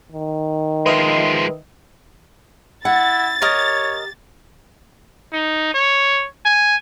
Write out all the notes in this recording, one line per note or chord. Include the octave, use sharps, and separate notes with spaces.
D#3
F3 G#3 B4 D#5 E5
E4 F#5 A6
G4 A#4 C#5 D#5
D#4
C#5
G#5